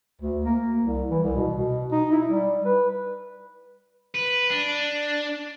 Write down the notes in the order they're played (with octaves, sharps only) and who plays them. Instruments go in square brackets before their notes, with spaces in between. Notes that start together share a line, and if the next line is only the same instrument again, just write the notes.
[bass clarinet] D2
A#3
C2
E3
C2
B2
B2
D#4
E4
G3
B4
[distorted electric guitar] B4
D4